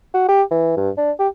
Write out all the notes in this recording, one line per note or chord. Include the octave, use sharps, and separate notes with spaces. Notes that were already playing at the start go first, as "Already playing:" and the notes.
F#4
G4
E3
G2
D4
G4